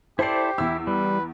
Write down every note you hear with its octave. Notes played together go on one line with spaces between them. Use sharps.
E4 G4 A4 C5 D5 C7
E2 E4 E6
G3 B4